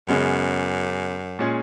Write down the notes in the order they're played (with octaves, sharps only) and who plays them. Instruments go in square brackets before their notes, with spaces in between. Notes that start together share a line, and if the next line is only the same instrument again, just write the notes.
[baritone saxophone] F#2 [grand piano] C#3 G#3 B3
[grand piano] A#2 G#3 C#4 G#4